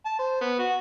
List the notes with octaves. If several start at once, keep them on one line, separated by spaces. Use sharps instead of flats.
A5
C5
B3
F#4